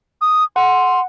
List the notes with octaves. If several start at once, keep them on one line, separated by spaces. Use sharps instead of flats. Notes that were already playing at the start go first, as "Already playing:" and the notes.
D#6
F#5 C6